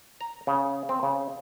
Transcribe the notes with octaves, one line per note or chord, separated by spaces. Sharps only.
A#5
C#3
C4
C#3